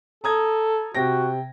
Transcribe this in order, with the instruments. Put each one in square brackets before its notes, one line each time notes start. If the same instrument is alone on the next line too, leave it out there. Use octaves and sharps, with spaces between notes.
[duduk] A4 [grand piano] A#5 D#6 G#6
[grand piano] C3 G5 A#6 [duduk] F#4